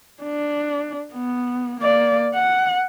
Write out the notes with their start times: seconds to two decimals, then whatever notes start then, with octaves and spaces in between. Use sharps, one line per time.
0.23 D4
1.13 B3
1.81 A#3 D5
2.34 F#5